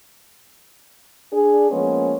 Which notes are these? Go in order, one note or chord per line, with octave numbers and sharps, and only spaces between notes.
D4 G#4
F3 G#3 A#3 B3 C#4